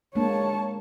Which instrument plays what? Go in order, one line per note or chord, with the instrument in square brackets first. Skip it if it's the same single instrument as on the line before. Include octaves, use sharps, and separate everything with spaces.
[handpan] G#3 A#3 D4 [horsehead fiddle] C#5 A5